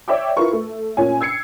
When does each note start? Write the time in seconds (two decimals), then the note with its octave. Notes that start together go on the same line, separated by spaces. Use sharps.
0.08 C#5 D5 E5 G5 D6
0.37 E4 F4 A#4 B4 C#6
0.53 A3
0.97 A#2 C#4 G#5
1.21 E6 G#6 C7 C#7